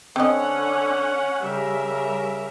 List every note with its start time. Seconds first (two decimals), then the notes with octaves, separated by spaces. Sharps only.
0.16 D3 C4 C#4 D#5 F#5
1.43 C#3 G3 A#4 E5